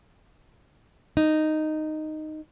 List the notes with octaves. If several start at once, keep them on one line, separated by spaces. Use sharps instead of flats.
D#4